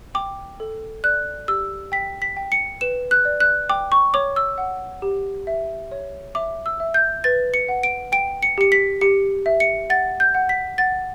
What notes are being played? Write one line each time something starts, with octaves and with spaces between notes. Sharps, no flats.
G5 D6
A4
D5 F#6
G4 E6
G5 B6
B6
G5
C#7
B4 E7
F#6
D5
F#6
G5 D6
C#6
C#5 D6
E6
F#5
G4
E5
C#5
E5 D6
E6
E5
G6
B4 A6
C#7
F#5
D7
G5 D7
C#7
G4 C#7
B6
G4 C#7
E5
C#7
F#5 A6
G6
F#5
B6
F#5 A6